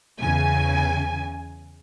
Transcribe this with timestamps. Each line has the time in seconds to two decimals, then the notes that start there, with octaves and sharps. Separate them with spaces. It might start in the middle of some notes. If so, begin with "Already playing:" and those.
0.20 E2 C#3 G#5